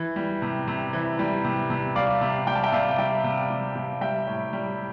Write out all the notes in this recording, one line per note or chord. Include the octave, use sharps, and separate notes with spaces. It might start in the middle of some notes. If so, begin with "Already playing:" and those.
Already playing: E3
G3
C3
C3
E3
G3
C3
C3
G3 D5 F5
C3
G3 G5
A5
E5 G5
C3 D5 F5
G3 E5 G5
C3
G3
C3
G3 E5 G5
A2
G3